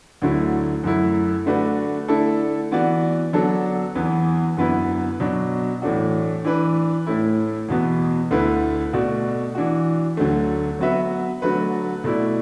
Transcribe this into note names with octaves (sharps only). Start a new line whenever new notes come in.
D2 D3 F#3 A3 E4
F#2 F#3 A3 E4
D3 A3 D4 F#4 B4
D3 A3 E4 A4 D5
E3 B3 F#4 D5
D3 F#3 B3 D4 A4
E2 E3 B3
F#2 D3 B3 E4 B4
B2 F#3 D4
A2 E3 A3 D4 F#4
E3 D4 B4
A2 A3 E4
E2 B2 B3
D2 D3 A3 E4 B4
B2 A3 F#4 D5
E3 D4 F#4
D2 D3 F#3 A3
F#3 B3 F#4 B4 E5
D3 F#3 A3 F#4 B4
B2 A3 E4 D5